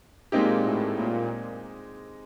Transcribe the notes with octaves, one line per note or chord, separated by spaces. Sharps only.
A#2 G#3 C4 D#4 G4
A2
A#2